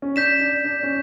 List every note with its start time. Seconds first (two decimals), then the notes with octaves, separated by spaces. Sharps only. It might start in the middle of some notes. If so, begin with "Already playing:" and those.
0.02 C#4
0.16 D4 G6 B6 E7
0.40 D4
0.65 D4
0.83 C#4